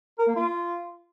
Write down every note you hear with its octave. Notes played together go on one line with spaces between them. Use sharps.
A#4
A#3
F4